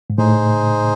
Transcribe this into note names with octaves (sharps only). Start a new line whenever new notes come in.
G#2
A2 D#4 G#4 C5